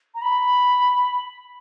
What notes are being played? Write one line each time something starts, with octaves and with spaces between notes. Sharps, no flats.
A#5
B5